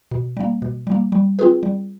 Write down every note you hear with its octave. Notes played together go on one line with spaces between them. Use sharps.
B2
G3 A#3
B2
G3 A#3
G3
C4 F4 G#4 B4
G3